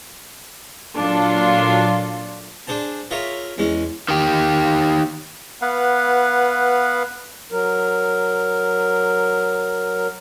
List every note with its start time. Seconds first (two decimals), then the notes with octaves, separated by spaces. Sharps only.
0.98 A#2 F#3 D4 F4 A4
2.67 D4 G#4 C5 A5
3.11 F4 G#4 A#4 C#5 E5
3.58 E2 G#3 C#4
4.09 D#3 G4
5.62 B3 B4 F5 F#5
7.52 F#3 A#4